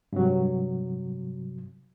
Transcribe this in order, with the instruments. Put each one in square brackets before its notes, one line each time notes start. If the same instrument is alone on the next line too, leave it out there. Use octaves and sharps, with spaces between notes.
[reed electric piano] G2 C3 F#3